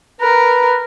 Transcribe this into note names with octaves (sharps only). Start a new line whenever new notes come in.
A#4 B4